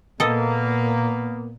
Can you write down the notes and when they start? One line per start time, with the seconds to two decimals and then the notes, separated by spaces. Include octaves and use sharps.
0.20 A#2 A#3 B3 A4 D#5